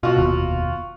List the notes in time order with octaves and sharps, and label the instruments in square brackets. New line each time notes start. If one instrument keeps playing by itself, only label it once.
[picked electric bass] B2 [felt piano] F4 F#4
[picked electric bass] F1 D#2 B2